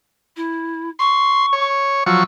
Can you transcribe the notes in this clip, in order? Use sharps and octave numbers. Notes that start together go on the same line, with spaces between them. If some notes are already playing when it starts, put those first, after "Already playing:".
E4
C6 C#6
C#5
F3 F#3 C#6 E6